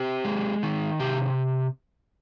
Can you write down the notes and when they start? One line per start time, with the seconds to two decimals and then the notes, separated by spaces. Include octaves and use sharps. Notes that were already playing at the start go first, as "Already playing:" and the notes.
Already playing: C4 G4
0.25 G#3
0.63 D#3
1.00 C3 G4